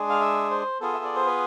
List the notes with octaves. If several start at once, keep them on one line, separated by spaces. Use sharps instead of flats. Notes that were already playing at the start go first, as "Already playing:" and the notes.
Already playing: G#3 D4 G#4
F5
E5
C5
B3 F4 G#4 A4
E5
D5
C5
B4